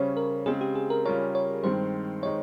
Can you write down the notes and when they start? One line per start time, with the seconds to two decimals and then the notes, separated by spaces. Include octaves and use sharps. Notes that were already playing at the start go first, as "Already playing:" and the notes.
Already playing: C#3 G3 C#4 C5 C#5
0.17 A#4
0.46 C#3 G#3 C4 G#4
0.61 G4
0.75 G#4
0.90 A#4
1.05 C#3 G3 C#4 F4 A#4 C#5
1.35 C#5
1.64 G2 D#3 G#3 C4 C5
2.23 D#3 G#3 D#4 C#5